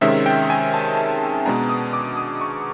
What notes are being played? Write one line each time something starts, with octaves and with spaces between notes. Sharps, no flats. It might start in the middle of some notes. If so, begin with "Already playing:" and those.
C3 D#3 G#3 C#4 E5
G5
G#5
A5
B2 G#3 B3 D4 A#5
D#6
D6
D#6
C#6